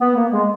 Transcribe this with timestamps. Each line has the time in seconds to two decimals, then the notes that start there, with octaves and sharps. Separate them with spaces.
0.01 B3
0.16 A#3
0.32 G#3